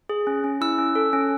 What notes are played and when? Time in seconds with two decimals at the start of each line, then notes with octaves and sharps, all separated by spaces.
0.09 G#4
0.27 C#4
0.44 C#4
0.61 E4 E6
0.78 C#4
0.95 A4
1.13 C#4